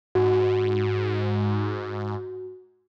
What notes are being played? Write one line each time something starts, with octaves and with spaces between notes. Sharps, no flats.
G#2 F#4